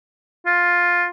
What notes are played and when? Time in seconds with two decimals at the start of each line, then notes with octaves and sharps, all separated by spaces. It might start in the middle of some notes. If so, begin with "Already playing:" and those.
0.46 F4